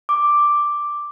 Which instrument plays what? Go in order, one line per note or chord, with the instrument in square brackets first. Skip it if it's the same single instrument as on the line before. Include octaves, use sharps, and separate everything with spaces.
[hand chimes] D6